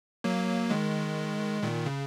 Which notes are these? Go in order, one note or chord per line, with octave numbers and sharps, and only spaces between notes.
F#3 A#3
D#3 G#3
A#2 D#3
C#3